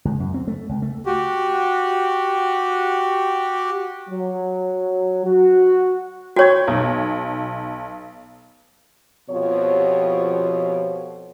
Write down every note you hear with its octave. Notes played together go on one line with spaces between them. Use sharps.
C#2
F#2
C4
A3
C#2
A3
F#4 G4
F#3
F#4
F#4 C#5 G5 C#6 G#6
B1
F2 B2 F3 G4 C#5